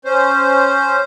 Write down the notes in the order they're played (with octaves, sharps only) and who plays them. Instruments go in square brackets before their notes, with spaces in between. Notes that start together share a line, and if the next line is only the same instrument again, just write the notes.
[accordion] C#4 C5